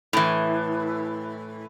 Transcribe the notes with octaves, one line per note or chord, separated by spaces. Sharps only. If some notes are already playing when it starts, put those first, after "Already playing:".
A2 E3